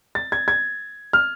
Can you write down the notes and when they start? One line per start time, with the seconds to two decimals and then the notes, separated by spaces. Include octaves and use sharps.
0.15 A6
0.32 G#6
0.48 G#6
1.13 F6